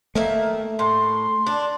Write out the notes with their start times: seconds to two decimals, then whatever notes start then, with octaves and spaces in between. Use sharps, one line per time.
0.15 D#3 A3 A#3 E5
0.79 A2 C6
1.46 D4